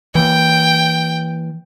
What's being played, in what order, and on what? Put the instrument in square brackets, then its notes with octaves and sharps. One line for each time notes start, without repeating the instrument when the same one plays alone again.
[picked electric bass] E3 A#3 [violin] G5